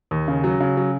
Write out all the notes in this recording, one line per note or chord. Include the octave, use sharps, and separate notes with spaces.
D#2
C#3
F#3
C#3
F#3